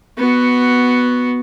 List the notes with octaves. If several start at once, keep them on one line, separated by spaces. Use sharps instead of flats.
B3 F#4